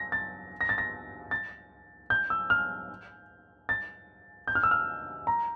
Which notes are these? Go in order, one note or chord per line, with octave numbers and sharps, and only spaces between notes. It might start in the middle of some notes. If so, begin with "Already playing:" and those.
Already playing: A#6
A6
A#6
A6
A#6
A6
G6
E6
F6
A6
G6
F6
E6
F6
A#5